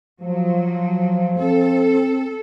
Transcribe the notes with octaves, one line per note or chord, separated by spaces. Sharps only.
F3 F#3
C4 A4